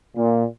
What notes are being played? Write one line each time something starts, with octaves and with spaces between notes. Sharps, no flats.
A#2